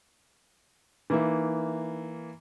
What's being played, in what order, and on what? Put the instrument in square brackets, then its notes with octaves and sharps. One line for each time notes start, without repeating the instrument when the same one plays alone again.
[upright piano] E3 A#3 [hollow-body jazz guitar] D#4 E5